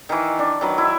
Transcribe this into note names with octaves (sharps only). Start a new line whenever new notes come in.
D#3 E3
D4
D#3 F#3 B4
E4